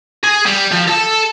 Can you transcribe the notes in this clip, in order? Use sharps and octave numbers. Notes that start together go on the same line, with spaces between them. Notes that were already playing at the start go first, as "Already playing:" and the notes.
G#4
G3
F3
A4 A5